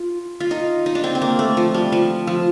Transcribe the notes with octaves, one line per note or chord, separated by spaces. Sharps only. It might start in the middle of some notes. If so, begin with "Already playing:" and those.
Already playing: F4
F4
D#4
D#4
D4
C4
C4
A#3
A3
F3
G3
F3
F3